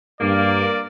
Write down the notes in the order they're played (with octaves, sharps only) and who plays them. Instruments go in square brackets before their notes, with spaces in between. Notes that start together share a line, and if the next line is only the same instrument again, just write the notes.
[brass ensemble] G2 [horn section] A#3 [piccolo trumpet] D5